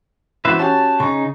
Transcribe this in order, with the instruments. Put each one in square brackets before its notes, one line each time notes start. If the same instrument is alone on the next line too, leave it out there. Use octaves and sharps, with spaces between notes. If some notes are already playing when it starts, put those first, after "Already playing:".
[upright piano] E3 B3 F#4 [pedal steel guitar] B4 C5 E5
[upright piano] C#4 F#4 G4 [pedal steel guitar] A5
[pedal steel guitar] C#3 D#4 [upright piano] C#6